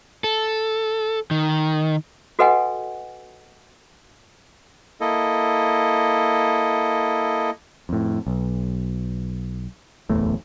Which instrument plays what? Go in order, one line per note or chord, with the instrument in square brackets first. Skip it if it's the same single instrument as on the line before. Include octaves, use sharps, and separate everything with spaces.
[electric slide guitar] A4
D#3
[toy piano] F#4 A4 B4 D#5 F#5 G#5
[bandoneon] A#3 E4 A4 D#5
[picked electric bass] F2 A2
B1
D1 A1 E2 A3